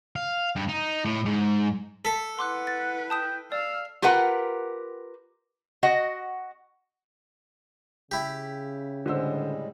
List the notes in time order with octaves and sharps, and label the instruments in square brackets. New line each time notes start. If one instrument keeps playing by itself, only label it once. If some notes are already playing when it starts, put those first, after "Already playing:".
[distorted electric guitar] F5
G2
D#4
A2
G#2
[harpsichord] A4 [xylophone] B6
[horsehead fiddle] E4 B4 [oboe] F#5 [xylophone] C6 D6 F#6
[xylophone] A6
[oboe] G5 [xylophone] A5 D#6 E7
[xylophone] D5 [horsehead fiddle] F5 [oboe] E6
[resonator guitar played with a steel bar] F4 G4 A#4 B4 F#5
F#4 D#5 F#5
[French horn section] C#3 [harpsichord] E4 G4
[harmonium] A2 G3 G#3 [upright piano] D3 C5 E6